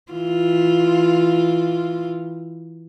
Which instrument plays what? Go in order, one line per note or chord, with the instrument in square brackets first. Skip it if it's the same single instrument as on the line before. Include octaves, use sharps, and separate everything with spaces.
[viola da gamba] E3 F4